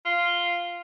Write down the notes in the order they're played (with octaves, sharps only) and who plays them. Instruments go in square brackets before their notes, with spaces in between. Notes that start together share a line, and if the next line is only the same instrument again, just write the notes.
[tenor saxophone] F4